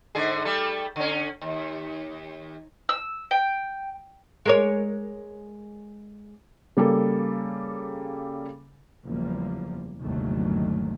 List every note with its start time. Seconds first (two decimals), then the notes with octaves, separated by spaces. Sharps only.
0.15 G#2 D3 G#4
0.45 G3 A3 A4
0.96 D3 C#4
1.41 D#2
2.89 E6
3.31 G5
4.45 G#3 A#4 C#5
6.77 C#3 G3 A#3 A4
9.06 F#1 E2 F3 G3 A#3
10.01 G1 D#2 C3 D#3 F#3 A3